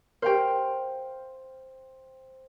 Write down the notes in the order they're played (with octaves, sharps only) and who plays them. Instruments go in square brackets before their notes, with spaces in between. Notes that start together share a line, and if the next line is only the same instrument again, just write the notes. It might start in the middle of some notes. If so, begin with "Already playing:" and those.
[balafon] G4 A#4 [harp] C5 F5 G5